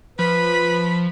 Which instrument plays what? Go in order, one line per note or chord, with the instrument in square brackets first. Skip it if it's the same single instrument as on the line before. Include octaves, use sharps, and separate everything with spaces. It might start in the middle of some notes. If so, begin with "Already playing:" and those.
[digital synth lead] F3 [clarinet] B4 [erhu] B5